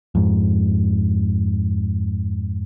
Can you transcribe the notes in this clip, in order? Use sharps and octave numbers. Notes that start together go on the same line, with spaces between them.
F2 G#2